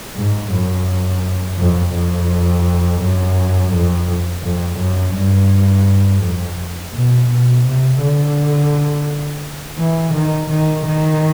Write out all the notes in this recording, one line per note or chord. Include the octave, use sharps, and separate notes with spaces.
G#2
F#2
F2
F2
F#2
F2
F2
F#2
G2
F2
B2
B2
C3
D3
E3
D#3
D#3
D#3